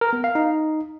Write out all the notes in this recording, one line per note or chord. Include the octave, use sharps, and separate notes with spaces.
A#4
B3
F5
D#4